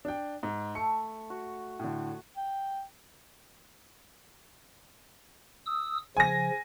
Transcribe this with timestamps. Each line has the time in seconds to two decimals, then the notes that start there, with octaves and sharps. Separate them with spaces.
0.05 D4 G5
0.43 G#2
0.75 A3 C#7
1.30 F#4
1.80 A2 D3
2.37 G5
5.66 D#6 E6
6.17 C#3 F3 G#5 A#6